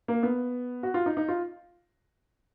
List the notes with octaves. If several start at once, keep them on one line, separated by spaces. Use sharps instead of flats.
A#3
B3
F#4
F4
D#4
D#4
F4